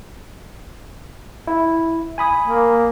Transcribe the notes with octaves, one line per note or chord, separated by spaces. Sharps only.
E4
G#5 B5 D#6
A#3